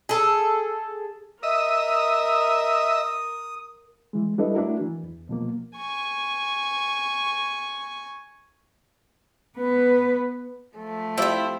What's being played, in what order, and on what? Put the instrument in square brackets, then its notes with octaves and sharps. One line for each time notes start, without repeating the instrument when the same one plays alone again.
[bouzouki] G#4 A4
[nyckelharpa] A#4 [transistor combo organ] D#5 E5 [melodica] D#6
[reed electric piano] E3 G#3
G3 D4 E4 A4 B4 D#5
A3 D4 E4 F#4 A#4
E3
E2
B2 F3 A#3
[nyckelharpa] G#5 C#6
[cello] B3 B4
[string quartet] F3 A3
[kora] C4 F4 G4 [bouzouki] E4 E5 [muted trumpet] C5